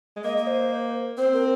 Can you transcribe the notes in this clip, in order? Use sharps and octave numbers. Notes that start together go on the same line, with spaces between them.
G#3
A#3 D#5
D#5
C5
C4 C5
A#4